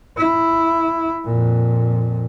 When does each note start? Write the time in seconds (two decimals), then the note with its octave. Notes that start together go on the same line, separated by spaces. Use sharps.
0.18 E4
1.25 F2 A#2